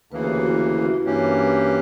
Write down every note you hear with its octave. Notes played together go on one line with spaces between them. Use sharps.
D2 C#3 E3 A#3 B4
G4
F#4
E4
F#4
E4
F#4
E4
G2 E3 A#3 C#4 G4